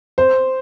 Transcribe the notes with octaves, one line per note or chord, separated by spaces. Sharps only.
C5